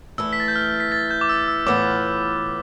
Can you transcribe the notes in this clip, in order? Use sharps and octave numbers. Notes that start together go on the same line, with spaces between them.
E3 A3 E4 E6
B6
A6
G6
F6
B6
A6
G6
D6
E6
E6
A2 E3 B3 F4 D6